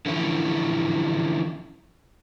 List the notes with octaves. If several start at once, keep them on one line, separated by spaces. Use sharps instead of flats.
D3 E3 F3 C#4 E4